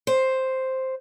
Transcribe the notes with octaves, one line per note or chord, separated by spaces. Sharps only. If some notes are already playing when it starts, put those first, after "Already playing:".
C5